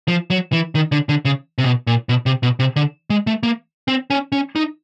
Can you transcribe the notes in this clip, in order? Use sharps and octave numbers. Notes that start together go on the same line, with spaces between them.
F3
F#3
E3
D#3
D3
D3
C#3
C3
B2
A#2
B2
C3
B2
C3
D3
G#3
A3
A#3
C4
C#4
C#4
D#4